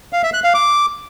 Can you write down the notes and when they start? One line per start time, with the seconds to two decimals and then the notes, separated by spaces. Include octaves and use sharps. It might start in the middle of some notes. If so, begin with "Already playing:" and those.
0.13 F5
0.23 E5
0.34 F#6
0.44 F5
0.54 D6